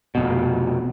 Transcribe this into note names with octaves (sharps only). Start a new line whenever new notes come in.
F1 B2